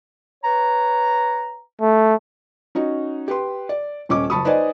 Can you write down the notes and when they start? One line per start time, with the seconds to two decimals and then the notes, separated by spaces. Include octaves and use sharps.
0.44 B4 C#5 A#5
1.81 A3
2.75 C#4 D#4 F#4
3.28 G4 B4 C6
3.69 D5
4.09 D#1 C#4 D#5 D6
4.30 F#1 A5 B5 C#6 D#6
4.45 D#4 B4 C5 D5 D#5 G#5